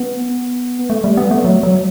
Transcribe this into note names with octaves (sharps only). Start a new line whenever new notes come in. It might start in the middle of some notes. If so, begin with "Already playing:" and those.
Already playing: B3
A3
G3
B3
A3
F#3
F#3